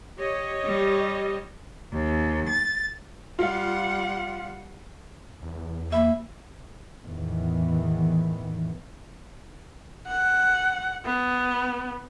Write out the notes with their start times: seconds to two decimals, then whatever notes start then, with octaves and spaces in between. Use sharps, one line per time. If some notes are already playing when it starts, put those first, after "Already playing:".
0.17 G4 C#5 D#5
0.65 G3
1.92 D#2
2.48 A6
3.39 G3 F4 F5 F#5
5.43 E2
5.92 A#3 E5 B5
7.04 E2 A2 D#3 E3 B3
10.08 F#5
11.05 B3